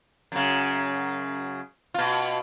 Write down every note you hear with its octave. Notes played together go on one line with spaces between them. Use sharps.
F#2 C#3
B2 F4